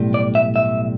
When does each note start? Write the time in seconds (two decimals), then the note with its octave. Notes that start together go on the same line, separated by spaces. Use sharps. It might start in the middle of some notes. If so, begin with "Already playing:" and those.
Already playing: B1 A2 G3
0.14 D5
0.35 E5
0.56 E5